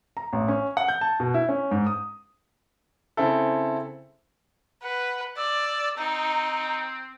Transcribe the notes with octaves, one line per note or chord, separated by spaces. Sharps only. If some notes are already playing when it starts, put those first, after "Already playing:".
A#5
A1
C#4
F#5
G6
A5
B2
E4
C#4
G#2
D#6
C#3 C4 E4 A4
B4 F#5
D5 E6
C4 D#4